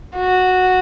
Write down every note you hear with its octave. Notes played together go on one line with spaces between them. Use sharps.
F#4